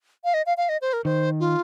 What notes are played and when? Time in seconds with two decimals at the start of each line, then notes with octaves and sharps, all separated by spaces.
0.24 F5
0.34 D#5
0.46 F5
0.57 F5
0.69 D#5
0.82 C5
0.93 A#4
1.05 D#3 C5
1.40 F4